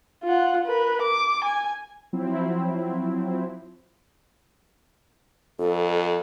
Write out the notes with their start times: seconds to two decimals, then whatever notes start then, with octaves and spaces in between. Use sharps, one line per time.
0.24 F4 F#5
0.66 A#4 B4
1.02 D6
1.44 G#5
2.13 F3 F#3 C4 E4
5.59 F2 A4